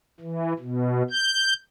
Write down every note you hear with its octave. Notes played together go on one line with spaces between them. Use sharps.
E3
B2
G6